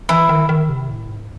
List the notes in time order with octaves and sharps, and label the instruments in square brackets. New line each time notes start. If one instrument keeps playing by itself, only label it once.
[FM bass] E3 [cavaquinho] E4
[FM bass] D#3
D#3
C3
A2
G#2